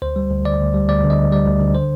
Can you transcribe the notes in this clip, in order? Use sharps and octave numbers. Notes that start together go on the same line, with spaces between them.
D2 C5
G3
D2
D3 D5
D2
G3
D2 D5
D3
D#5
D2
G3 D5
D2
D3
C5